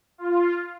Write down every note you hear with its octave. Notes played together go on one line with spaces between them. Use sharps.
F4